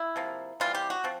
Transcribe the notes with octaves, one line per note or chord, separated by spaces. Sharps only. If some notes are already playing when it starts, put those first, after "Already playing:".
Already playing: E4
C3 F3 A#3
C3 E3 G3 F4
G4
F#4
F3 C4